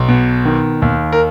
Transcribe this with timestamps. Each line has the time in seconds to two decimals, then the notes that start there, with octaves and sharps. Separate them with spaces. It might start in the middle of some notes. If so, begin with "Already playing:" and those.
Already playing: B1
0.08 B2
0.45 D#3
0.82 D#2
1.12 A#4